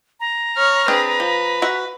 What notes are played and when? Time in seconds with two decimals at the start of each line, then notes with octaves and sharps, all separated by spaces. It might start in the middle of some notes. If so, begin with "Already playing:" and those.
0.20 A#5
0.56 C#5 F6
0.88 C4 D4 G#4 B4
1.20 F3
1.62 F#4 E5